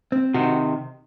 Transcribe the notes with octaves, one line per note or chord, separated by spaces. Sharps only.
C4
C3 D#3 F#4